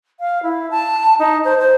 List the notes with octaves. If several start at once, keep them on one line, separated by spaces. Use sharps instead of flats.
F5
E4
A5
D#4
C5
C5